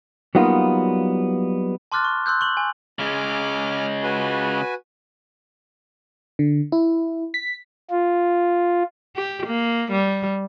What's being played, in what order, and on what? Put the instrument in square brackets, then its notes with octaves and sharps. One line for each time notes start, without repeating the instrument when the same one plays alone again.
[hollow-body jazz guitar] F#3 G3 A#3 B3 D#4 F4
[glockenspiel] A5 C6 D6 F6 F#6 A6
C#6
C6 E6 F#6 G6
C#6 F#7
G#5
[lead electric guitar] C#3 G#3 [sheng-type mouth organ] G#5 D6 F6
[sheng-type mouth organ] F#4 B4 G#5
[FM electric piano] D3
E4
B6
[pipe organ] F4
[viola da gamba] G4
A#3
G3